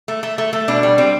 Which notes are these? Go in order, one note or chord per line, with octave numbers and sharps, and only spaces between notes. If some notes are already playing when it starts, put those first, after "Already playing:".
A3
A3
A3
A3
B2 D4
G3
G3 C4